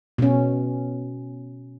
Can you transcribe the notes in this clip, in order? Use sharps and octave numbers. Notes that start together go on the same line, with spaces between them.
B2 C#4